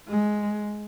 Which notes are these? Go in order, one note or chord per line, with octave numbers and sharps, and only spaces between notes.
G#3